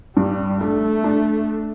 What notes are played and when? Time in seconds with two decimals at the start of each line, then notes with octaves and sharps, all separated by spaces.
0.17 G2 G3
0.61 A3 D4
1.04 D4